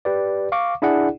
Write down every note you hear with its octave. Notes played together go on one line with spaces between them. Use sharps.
G4 B4 D5
F5 C#6 D6
D4 E4 G#4 D5 F#5